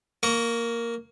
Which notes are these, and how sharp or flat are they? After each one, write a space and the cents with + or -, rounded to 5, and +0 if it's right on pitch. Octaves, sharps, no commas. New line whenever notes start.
A#3 +0 C#6 +20